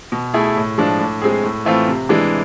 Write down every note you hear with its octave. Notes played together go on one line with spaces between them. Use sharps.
B2
A3 E4 G#4
A2
F3 G#3 D4
A2
G#3 C4 G#4
A2
E3 A3 C4 F4
C3
E3 G#3 D4